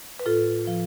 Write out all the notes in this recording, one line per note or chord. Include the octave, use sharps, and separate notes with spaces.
B4
A2 F4 A4
F3